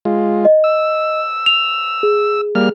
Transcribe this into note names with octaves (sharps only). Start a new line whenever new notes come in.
G#3 F4
D#5
E6
F7
G#4
G3 A#3 F6